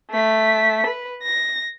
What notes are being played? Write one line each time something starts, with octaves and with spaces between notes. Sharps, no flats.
A3 B6
B4
A#6